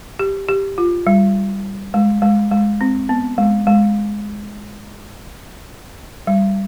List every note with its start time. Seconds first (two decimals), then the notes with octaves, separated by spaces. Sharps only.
0.19 G4
0.49 G4
0.78 F4
1.07 G3
1.94 G#3
2.22 G#3
2.51 G#3
2.81 C4
3.09 B3
3.38 G#3
3.67 G#3
6.27 G3